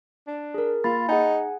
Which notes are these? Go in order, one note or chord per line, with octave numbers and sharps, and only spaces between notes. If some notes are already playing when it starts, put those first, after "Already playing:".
D4
G#4 A#4
A#3 F4 B5 A6
D#4 G#4 F#5 G#5